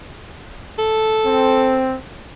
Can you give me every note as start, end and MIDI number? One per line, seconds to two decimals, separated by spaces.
0.79 1.87 69
1.26 1.96 60